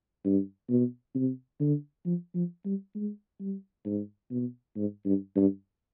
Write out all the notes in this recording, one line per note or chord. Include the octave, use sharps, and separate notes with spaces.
G2
B2
C3
D3
F3
F3
G3
G#3
G3
G#2
B2
G#2
G2
G2